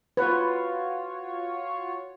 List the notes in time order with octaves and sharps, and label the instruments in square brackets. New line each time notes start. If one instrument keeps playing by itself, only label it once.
[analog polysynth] F4 F#4 C#5 [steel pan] B4